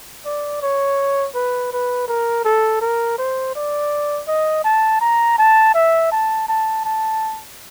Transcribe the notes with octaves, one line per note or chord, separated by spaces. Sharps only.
D5
C#5
B4
B4
A#4
A4
A#4
C5
D5
D#5
A5
A#5
A5
E5
A5
A5
A5